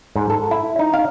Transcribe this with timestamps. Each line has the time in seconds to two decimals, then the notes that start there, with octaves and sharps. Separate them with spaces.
0.16 G#2
0.30 A4
0.51 E4
0.79 D#4
0.94 F5